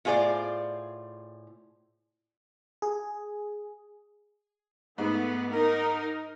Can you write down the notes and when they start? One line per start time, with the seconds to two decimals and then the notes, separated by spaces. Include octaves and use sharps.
0.05 A2 F4 G#4 C5 D5
2.82 G#4
4.98 G#2 A3 B3
5.52 D#4 A#4